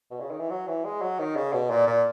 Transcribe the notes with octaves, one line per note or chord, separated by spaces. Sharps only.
B2
C#3
D#3
E3
F#3
E3
G#3
F#3
D#3
C#3
B2
A#2
A#2